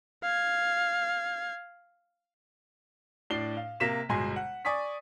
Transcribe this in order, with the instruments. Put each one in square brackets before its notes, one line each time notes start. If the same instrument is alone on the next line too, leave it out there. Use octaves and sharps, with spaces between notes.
[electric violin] F5 G#6
[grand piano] A2 D4 C7 G7
F5
C3 A#3 B6 E7
G1 B2 G#3 G#5 C6
F#5
D5 G#5 C#6 D#6 B6